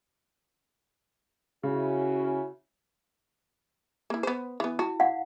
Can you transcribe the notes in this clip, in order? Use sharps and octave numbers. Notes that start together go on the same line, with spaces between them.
C#3 C#4 E4 F#4
A#3 E4
B3 C5
E3 B3
E4 F#4
F5 F#5